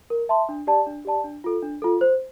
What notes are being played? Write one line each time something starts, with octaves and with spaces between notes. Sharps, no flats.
A#4
E5 A5 C6
D4
G4 D5 A5
D4
G4 D5 A5
D4
F4 A4
D4
F4 A4
C5